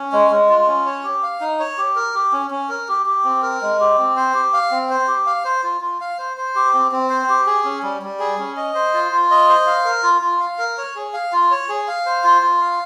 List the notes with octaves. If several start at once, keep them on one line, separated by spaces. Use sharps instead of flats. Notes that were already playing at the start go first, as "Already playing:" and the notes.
Already playing: C#4
G#3
G#3
F4
C#4
C#5
G4
F5
D#4
C#5
G4
A#4
G4
C#4
C#4
A#4
G4
G4
C4
A#4
G#3
G4
C4
C5
G4
F5
C4
C5
G4
F5
C5
F4
F4
F5
C5
C5
G4
C4
C4
C5
G4
G#4
C#4
G3
G3
G#4
C#4
D#5
C5
F4
F4
D#5
C5
F5
A#4
F4
F4
F5
A#4
C#5
G#4
F5
F4
C#5
G#4
F5
C5
F4
F4
F5